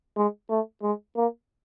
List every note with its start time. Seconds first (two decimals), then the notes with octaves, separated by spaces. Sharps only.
0.17 G#3
0.50 A3
0.82 G#3
1.16 A#3